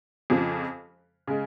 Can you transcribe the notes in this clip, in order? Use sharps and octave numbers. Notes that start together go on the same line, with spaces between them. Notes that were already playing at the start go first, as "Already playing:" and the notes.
F2 C#3 F3
C#3 G#3